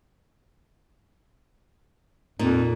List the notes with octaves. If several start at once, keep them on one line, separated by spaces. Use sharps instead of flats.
F2 A#2 D#4